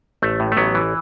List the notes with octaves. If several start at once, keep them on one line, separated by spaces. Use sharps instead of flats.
A1 A3
A2
A3
A1 F#3 B3
E3